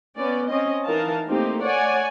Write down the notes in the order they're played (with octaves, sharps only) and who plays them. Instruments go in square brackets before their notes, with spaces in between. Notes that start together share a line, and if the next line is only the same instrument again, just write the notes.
[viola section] B3 C#4 D5
C4 C#4 D#5
E3 D#4 A#4 F5 A5
A3 A#3 C4 D#4 G4
C#5 D5 F#5 G#5